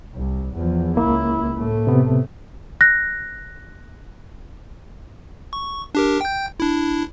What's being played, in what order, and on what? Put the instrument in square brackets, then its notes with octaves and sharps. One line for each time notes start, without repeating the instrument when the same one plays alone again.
[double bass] C2
E2 F3
[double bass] C#2 E4 [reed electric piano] A#3
[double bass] A2 A3
[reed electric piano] C3 B3
[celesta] F#6 A#6
[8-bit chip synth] C#6
D4 G4 A#4
G5 G6
D4 E4